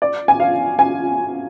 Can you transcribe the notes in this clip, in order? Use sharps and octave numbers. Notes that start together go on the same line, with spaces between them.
D5
G#5
F5
G#5